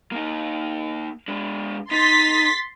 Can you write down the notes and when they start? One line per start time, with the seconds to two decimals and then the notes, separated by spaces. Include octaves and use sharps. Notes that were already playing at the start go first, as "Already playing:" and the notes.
0.12 A#3 D#4
1.28 G#3 D4
1.91 D#4 C6 A6 B6